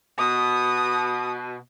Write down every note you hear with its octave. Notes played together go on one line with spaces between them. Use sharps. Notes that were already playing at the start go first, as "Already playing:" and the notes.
B2 D#6